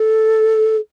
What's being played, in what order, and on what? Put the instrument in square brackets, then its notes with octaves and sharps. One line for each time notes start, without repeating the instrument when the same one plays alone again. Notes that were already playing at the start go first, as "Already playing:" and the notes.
Already playing: [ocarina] A4